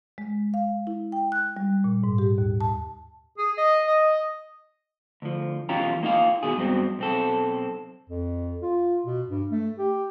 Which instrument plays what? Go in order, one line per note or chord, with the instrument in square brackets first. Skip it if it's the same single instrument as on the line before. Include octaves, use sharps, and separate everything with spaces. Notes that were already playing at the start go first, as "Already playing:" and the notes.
[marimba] G#3
F5
E4
G5
F#6
G3
A#2
G#2
G4
D#2
A5
[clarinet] G#4
D#5
D#5
[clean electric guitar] D2 F3
B1 E3 C#4 F4 G4 A#5
A#3 D#4 F4 F5
B2 D#3 G#4
G2 F#3 B3 C4
B1 C4 A4
[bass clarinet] F2
F4
B2
G2
A3
G4